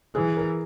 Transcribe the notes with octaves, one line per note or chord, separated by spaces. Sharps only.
E3 G#4
A#4